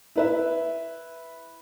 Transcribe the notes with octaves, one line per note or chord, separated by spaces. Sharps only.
E4 B4 E5